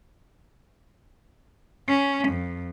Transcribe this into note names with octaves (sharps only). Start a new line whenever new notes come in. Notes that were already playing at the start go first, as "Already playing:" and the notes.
C#4
F2